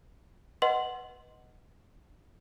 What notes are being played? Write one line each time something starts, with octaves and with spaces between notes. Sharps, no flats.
B4 D#5 F#5 C6